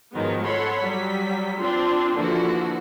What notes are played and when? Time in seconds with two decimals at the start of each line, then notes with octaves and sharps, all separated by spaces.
0.13 G#2 D#3 F3 F#3 G#3 B3
0.44 A4 C#5 F#5 B5 C6
0.80 F#3 G3 B6
1.58 C4 D4 F4 C6
2.14 D3 E3 F3 A#3 E4 F#4